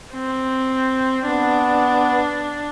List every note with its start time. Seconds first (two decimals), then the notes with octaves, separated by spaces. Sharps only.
0.13 C4
1.26 B3 D4